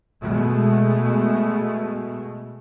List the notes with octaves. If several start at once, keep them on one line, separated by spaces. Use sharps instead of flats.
B2 G#3 A3